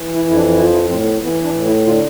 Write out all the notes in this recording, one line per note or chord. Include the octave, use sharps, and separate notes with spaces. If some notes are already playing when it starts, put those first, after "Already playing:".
Already playing: E3
E4
F2 E4
D4
F3 E4
E4
A2 C4
B3
E3 B3
D4
A2
E4
D3 F4